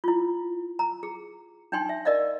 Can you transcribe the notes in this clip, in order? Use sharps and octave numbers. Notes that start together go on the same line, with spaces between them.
E4 F4
A#5
G#4
D4 D#4 G5 G#5 C6
E5
A#4 D5 D#5 F5